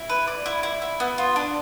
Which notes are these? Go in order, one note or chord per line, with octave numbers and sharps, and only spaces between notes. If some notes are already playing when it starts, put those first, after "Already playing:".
Already playing: E4
B4
D5
E4
E4
E4
B3
F4
D4